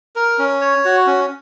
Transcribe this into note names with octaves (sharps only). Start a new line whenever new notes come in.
A#4
C#4
C#5
F#4
C#4